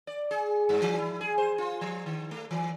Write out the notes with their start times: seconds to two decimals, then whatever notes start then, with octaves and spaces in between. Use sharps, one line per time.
0.07 D5
0.31 G#4
0.69 G2
0.82 E3
0.98 E4
1.21 G#4
1.38 C5
1.58 F4
1.81 F3
2.06 D#3
2.31 A3
2.51 E3